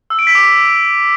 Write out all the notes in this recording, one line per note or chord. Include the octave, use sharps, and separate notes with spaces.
E6
D7
B6
D6